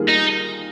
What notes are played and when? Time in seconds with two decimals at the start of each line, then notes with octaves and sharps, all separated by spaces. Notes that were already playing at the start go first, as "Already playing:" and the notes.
Already playing: D#3 G3 A#3 F4 G#4
0.08 D#4